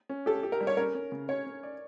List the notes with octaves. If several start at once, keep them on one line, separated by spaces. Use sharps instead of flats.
C#4
G4 A4
G4
A#4
G3
C#5
C#4 A#4
C#4
C#3
C#4 C#5
C#4
D5